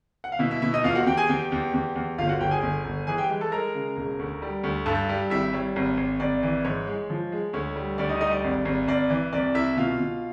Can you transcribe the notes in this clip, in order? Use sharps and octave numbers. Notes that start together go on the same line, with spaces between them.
F#5
F5
B2 E4 E5
E4 E5
B2 E4 E5
D#4 D#5
E2 F4 F5
F#4 F#5
E2 G4 G5
G#4 G#5
E2 G4 G5
E2
E2
E2
G1 F4 F5
F#4 F#5
G1 G4 G5
G#4 G#5
G1
G1
E3 G#4 G#5
G4 G5
G#3
A4 A5
G#3 A#4 A#5
C#3
E1
D2
G3
D2
G2 A4 A5
G3
G#1 E4 E5
G3 C#5
G#1
G#1
G#1 D5
E3
G#2 C#5
G#3
F3
G#3
D2 C#5
G3
D2 D5
D#4 D#5
G3 D#4 D#5
D5
G#1
G#1
G#1 D5
E3
C2 D5
C2 E4 E5
B2 F4 F5
B2